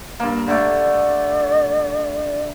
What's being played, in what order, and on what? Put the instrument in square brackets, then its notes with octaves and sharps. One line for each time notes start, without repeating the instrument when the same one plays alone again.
[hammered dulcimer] G2 A#3
[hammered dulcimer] D3 A3 [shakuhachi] D5